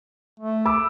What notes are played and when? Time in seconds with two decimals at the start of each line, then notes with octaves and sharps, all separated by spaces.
0.40 A3
0.65 B5 D6 E6